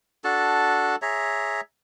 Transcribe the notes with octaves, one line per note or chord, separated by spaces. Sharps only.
D4 F#4 A4 A5
G#4 C#5 E5 A#5